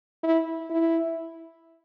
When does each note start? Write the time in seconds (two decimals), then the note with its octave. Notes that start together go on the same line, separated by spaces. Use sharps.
0.23 E4
0.70 E4